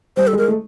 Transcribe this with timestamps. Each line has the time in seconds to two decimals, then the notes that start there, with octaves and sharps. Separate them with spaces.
0.17 G3 C5
0.27 A4
0.33 G#3
0.38 A#4
0.48 A3